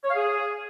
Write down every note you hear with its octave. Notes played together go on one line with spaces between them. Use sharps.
C#5
F5
G#4